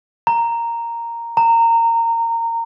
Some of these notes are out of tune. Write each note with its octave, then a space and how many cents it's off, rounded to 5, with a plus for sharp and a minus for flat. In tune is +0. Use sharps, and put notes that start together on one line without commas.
A#5 -5
A#5 -20